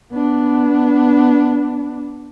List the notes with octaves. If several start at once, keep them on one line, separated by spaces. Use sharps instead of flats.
B3 D4